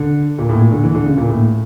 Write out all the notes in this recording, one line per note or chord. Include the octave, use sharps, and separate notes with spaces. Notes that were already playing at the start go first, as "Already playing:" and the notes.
Already playing: D3
A#2
A2
A#2
D3
E3
D3
C#3
A#2
A2